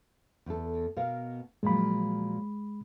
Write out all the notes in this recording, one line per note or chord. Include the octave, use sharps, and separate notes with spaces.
E2 A4
B2 A#4 F5
A#2 F3 F#3 G#3 B5